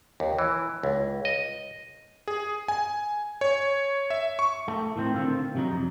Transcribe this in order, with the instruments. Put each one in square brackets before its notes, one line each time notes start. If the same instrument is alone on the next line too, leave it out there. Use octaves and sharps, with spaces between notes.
[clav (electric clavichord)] D#2
E3
C#2
D#5
[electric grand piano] G#4
G#5
C#5
E5
C#6
[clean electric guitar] A3
A2 D#3 C4
D3 D#3 F#3 C4 F4
C3 F#3 D#4
F2